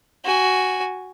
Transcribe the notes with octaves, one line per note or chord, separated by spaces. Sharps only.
F#4 G#5